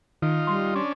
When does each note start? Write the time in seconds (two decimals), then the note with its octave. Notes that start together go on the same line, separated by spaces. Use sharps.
0.22 D#3 D#4 F4
0.47 G3 C6
0.75 C#4 D4